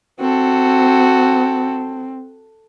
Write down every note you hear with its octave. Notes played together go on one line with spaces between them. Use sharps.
C4 F#4 A4